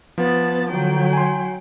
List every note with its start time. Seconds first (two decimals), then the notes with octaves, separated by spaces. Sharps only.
0.18 F3 B3 A5
0.70 D3 F#3 G5
1.13 G#5 C6